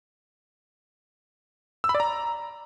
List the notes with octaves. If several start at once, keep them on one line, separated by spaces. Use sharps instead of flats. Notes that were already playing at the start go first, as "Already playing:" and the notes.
E6
B5
D5
A#5